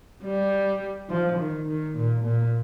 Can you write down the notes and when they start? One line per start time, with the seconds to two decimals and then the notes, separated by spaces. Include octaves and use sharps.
0.23 G3
1.09 F3
1.38 D#3
1.67 D#3
1.95 A#2
2.25 A#2